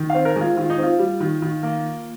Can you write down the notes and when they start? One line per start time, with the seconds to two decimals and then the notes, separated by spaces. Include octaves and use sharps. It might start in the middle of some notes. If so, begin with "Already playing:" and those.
Already playing: D#3
0.10 C4 F5
0.25 A#4
0.36 G#3 F4
0.57 D#3 F4
0.70 D#4
0.78 C4 F4
0.99 G3
1.20 D#3
1.42 D#3
1.63 A#3